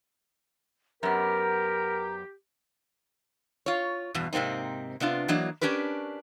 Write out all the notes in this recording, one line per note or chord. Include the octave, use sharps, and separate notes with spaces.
F#2 B3 G4 A#4 A#5
F4 C#5
E2 G2 B2
G#2 C3 A#3 C4 D#4
C3 B3 D4 F4
E3 F#3 A#3 D4 D#5
C#4 D4 G4 A#4 B4